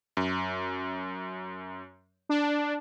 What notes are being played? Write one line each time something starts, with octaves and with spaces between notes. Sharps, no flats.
F#2
D4